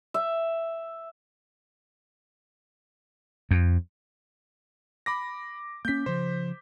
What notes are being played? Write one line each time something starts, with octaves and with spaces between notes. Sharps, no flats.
E5
F2
B5 D6 A#6
A#3 C#4 G6 B6
C#3 F3 C5